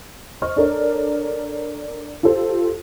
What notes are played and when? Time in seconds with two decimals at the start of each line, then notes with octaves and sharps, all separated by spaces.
0.42 C5 D#5 C#6 F6
0.56 D4 A4 A#4 C#5
2.23 F4 G4 A4 C5